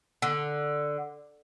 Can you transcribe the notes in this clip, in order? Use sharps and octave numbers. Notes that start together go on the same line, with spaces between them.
D3